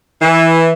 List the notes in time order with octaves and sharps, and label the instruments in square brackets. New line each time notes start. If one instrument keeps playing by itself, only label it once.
[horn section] E3